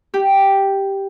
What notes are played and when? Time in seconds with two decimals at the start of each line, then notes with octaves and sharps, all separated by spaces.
0.14 G4